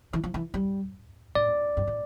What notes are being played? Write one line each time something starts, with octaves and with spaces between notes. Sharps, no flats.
E3
F3
E3
G3
A2 D5
G2
A2